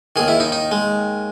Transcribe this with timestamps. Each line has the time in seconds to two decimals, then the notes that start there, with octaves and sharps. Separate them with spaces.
0.16 D#2 D#3 G#4
0.28 E4
0.40 D#4
0.52 D#4
0.72 G#3